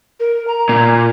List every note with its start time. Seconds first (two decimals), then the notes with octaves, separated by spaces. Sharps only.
0.20 A#4
0.48 A#5
0.69 A#2